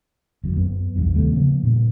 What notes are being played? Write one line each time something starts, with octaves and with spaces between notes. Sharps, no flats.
G1 F#2
F#2 B3
B1 E2 G2
D#2 C3 G3 A3
C#3 F3 A#3 B3
G2 A#2